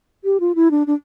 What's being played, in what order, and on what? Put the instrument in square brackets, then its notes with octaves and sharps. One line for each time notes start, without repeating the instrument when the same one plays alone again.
[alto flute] G4
F4
E4
D4
D4